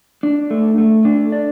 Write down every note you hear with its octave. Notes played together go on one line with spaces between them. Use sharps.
D4
A3
A3
D4
D5